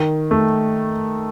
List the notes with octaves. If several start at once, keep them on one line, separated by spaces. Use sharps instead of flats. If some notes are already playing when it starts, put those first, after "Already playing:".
Already playing: D#3
A3